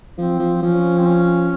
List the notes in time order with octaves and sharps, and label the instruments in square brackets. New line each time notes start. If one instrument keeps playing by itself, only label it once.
[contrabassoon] F3 [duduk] C4
[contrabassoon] F3
[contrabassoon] F3 [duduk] C#4
[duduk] C4
C#4